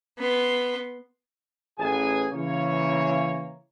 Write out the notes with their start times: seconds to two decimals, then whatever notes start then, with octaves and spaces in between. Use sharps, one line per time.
0.18 B3 C6
1.79 A1 G#4 G#5
2.32 C#3 E3 A#3 C#5